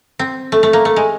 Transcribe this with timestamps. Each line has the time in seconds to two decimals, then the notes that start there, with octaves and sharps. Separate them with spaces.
0.19 C4
0.52 A3
0.63 A3
0.73 A#3
0.85 A3
0.96 G#3